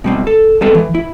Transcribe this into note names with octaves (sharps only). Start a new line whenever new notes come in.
B2 G3 C4
A4
G3 G#3 B3 C4 A4
E3
E4